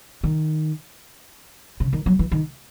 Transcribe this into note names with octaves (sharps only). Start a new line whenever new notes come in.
D#3
C#3
D#3
F#3
E3
D#3